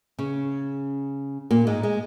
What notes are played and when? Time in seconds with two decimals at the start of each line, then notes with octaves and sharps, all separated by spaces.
0.19 C#3 C#4
1.51 A#2 A#3
1.67 G#2 G#3
1.83 G#3